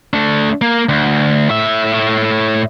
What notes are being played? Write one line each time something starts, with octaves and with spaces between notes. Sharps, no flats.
A3 D4
A#3
D2
A2 E5